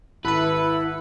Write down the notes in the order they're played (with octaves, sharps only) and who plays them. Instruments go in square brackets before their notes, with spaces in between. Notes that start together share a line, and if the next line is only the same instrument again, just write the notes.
[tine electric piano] G#1 B5 [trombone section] E4 [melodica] A4 F#5 [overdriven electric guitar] B4